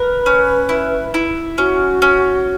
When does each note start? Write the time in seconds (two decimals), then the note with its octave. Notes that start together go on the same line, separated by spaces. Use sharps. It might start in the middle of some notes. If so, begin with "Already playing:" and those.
Already playing: A#4 B4
0.26 C#4
0.69 E4
1.14 E4
1.58 C#4 F#4
2.02 C#4